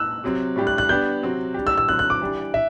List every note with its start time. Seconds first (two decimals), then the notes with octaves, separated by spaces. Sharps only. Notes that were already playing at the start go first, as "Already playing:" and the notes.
Already playing: E6 F#6
0.24 C3 F#3 C4
0.56 A2 G3 D4 G4
0.67 F#6
0.78 F#6
0.89 G3 B3 D4 G4 G6
1.22 C3 F#3 C4 F#4
1.54 G3 D4 G4
1.67 E6
1.78 E6
1.89 D3 F#3 C4 F#6
1.99 F#6
2.10 D6
2.21 E3 G3 D4 G4
2.54 E5